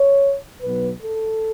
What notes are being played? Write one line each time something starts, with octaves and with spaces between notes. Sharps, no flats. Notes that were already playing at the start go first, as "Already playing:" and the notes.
Already playing: C#5
B1 B2 F#3 B3 B4
A4